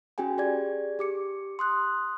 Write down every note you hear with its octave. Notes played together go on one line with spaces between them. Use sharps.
C#4 F#4 G#4 G5 G#5
G4 G#4 D5 G#6
G4 D6 C#7
C6 D#6 F#6